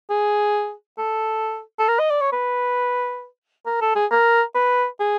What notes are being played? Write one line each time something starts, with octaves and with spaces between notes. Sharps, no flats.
G#4
A4
A4
A#4
D#5
D5
C#5
B4
A#4
A4
G#4
A#4
B4
G#4